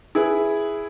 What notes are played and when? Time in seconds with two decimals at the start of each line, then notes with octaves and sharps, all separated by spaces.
0.15 E4 G#4 B4